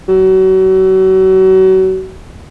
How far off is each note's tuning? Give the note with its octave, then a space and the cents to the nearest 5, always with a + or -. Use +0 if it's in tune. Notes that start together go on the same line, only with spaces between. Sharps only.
F#3 +35